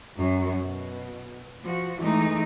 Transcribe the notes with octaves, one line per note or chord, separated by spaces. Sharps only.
F#2
B2
F3 F#4
E3 G#3 A3 D#4